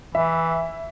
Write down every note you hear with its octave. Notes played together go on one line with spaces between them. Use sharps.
E3 E5